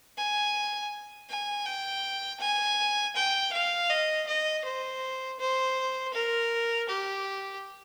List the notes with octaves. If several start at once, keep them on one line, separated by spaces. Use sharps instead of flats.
G#5
G#5
G5
G#5
G5
F5
D#5
D#5
C5
C5
A#4
G4